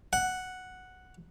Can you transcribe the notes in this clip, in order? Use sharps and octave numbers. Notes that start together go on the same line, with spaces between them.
F#5